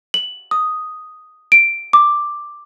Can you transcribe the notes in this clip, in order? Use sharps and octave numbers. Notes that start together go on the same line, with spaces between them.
F#7
D#6
D7
D6